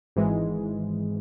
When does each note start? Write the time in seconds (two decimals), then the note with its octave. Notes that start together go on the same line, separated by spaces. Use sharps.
0.16 G#1 G#2 E3 G#3